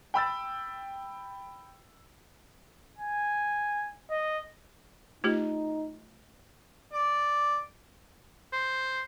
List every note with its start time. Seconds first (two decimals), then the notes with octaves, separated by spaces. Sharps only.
0.14 G5 B5 E6 A6
2.98 G#5
4.10 D#5
5.24 A3 D#4 F4 G4
6.93 D5
8.53 C5